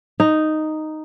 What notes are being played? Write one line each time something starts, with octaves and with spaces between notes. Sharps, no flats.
D#4